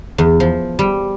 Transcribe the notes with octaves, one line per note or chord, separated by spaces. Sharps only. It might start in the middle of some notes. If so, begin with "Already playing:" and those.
E2
F3
G3